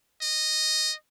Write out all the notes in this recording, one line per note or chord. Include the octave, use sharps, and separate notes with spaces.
D#5